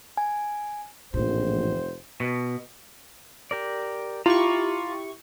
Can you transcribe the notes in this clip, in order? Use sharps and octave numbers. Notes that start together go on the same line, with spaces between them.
G#5
F1 A#1 A2 E3 C5
B2
G4 A#4 D5
E4 F4 G4 A#5 B5 C#6 D6